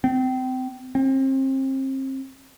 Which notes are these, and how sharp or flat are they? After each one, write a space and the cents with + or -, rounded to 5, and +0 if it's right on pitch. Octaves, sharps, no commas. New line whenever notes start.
C4 -30
C4 +35